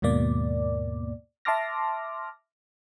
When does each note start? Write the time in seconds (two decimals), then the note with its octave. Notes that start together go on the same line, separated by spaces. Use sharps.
0.02 D#2 G#2 B2 A#3 D5
1.45 E5 A5 C6 D6 F6 A#6